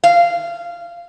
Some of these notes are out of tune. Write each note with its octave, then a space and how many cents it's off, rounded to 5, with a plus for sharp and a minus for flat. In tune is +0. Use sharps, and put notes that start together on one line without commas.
F5 -15